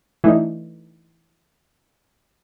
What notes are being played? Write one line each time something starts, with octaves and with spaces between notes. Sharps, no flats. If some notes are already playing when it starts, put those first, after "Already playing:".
E3 A3 D4 D#4